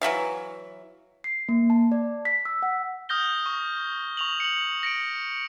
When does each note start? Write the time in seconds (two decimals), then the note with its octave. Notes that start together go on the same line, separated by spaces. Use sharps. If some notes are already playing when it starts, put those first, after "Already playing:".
0.01 E3 F#3 E5 F5
1.24 C7
1.49 A#3
1.70 A5
1.92 D5
2.25 B6
2.45 E6
2.62 F#5
3.09 D#6 F6 G6 A#6 G7
3.46 C#6
4.17 C#6 F7 F#7
4.40 C#7 F#7
4.83 A#6 C#7 D7